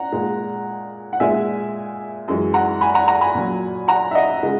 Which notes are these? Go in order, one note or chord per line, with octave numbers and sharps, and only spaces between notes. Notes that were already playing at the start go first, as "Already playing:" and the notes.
Already playing: F#5 A#5
A#2 G#3
F#5
A#2 G#3 E5 G#5
F#2 E3 G#3
F#5 A#5
G#5 B5
F#5 A#5
F#5 A#5
G#5 B5
A#2 F#3
F#5 A#5
E5
D#5 F#5
C#3 G#3